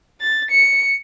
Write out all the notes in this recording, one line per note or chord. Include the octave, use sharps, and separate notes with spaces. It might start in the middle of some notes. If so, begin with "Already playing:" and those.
A6
C#7